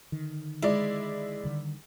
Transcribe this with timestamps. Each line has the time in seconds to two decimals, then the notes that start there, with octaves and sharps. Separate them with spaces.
0.12 D3 D#3
0.62 G#3 E4 D5
1.44 D3 D#3 G3